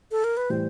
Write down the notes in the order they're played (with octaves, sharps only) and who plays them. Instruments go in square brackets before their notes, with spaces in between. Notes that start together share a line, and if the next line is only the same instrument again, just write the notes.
[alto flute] A4
A#4
B4
[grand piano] A2 E3 G3 [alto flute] C5